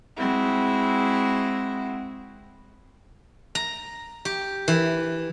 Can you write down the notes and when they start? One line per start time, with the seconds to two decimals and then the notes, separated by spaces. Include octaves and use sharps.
0.17 G#3 C4 E4 F#4
3.55 A#5
4.25 G4
4.68 E3